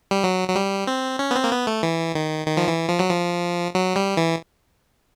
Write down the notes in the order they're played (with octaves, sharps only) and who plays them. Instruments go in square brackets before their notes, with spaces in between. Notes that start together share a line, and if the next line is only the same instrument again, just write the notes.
[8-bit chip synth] G3
F#3
F#3
G3
C4
C#4
B3
C4
A#3
B3
A3
E3
D#3
D#3
F3
E3
F3
F#3
F3
F#3
G3
E3